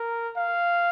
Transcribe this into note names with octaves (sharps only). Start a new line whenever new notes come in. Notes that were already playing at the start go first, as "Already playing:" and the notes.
Already playing: A#4
F5